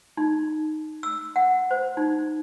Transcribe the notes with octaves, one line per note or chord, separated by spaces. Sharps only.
D#4
E6
F#5
C5
D#4